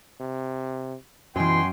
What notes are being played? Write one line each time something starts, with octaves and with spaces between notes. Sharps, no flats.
C3
F#2 B2 E3 F#3 G5 G#5 C6